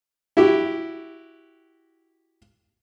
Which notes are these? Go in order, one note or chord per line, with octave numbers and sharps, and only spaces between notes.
E4 F#4 G4